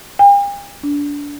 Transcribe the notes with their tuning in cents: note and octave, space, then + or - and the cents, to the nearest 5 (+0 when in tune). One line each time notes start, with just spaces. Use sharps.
G5 +45
D4 -25